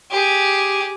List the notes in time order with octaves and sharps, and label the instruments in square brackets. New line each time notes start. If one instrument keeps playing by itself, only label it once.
[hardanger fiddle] G4 G#4